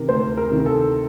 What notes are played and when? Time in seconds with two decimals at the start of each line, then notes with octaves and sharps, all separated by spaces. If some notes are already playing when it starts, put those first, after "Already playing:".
Already playing: C3 D#3 A#4
0.09 D2 C5
0.37 A#4
0.52 C3 D#3
0.60 A#4
0.66 A4